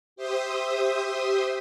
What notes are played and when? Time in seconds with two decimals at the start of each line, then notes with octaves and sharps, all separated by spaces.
0.16 G4 C5 E5 C6 D#6